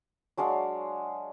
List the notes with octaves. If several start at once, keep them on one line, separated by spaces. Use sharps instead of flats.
F#3 G#3 D4 F5